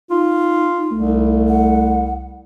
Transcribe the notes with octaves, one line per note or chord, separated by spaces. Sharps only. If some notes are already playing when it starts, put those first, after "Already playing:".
D#4 F4
C2 A3
F#5